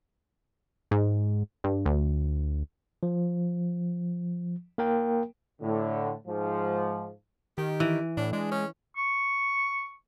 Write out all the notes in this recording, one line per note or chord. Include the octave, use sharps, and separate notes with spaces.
G#2
G2
D2
F3
A#3 A#4 G5
A2 D3
G#2 F3
D#3 G4
E3
A2 D4
G#3 D4
C#4
C#6